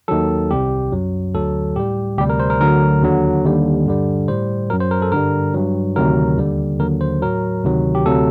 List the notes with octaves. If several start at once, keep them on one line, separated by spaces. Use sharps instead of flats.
D#2 D#3 F#3 A4
C2 C3 G3 G4
F#2 F#3
D2 D3 F#3 A4
A2 G3 G4
D2 C3 G3 G4
A#4
C5
A#4
D2 D3 F#3 A#4
D#2 D3 F#3
D#2 D3 G3
G2 D3 G3
A2 G3 C5
F#2 F#3 A#4
C5
A#4
A4
G2 D3 G3 A#4
G2 F#3
D2 C3 D#3 F#3 A#4
D#2 D3 G3
D#2 D3 F#3 A#4
C5
A2 F#3 A#4
D2 C3 D#3 F#3
G4
D2 C3 F#3 A4